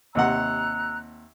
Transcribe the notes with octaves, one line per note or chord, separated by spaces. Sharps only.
D#2 C3 F#5 A#5 E6 F#6